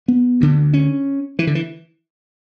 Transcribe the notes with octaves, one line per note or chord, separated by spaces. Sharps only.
B3
D2 D3
C#4
E3
D3
E3